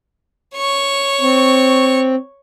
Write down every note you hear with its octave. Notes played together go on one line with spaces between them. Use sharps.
C#5 C#6
C4